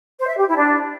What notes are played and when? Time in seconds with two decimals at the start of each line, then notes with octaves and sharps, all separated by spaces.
0.19 C5
0.28 E5
0.37 G4
0.47 E4
0.56 D4